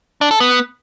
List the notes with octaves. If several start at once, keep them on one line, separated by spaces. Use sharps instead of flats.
D4
A4
B3